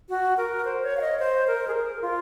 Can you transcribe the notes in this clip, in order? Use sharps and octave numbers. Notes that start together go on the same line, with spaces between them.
F#4
A#4
C5
C#5
F5
D#5
C5
A#4
G#4
A#4
F4